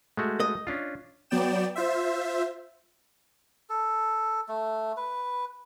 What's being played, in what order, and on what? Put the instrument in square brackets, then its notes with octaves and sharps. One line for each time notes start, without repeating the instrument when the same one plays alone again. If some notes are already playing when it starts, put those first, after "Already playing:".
[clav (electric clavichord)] G#3 A3 F#4
[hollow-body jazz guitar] D#5
[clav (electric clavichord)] C#4 D4 F4
[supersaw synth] F#3 B3 D5 G5 E7
F4 C5 E5
[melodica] A4
A3
B4